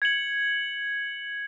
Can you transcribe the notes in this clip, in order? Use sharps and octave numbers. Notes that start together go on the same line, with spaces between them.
G#6 C#7 F#7